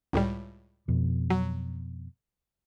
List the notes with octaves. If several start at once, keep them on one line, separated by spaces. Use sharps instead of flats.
C#2 A2 G3
F2 B2
F#3